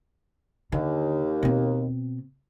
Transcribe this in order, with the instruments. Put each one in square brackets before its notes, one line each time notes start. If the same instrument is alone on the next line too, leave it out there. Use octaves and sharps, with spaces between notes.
[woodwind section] D#2 [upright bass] D3
[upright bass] B2 C4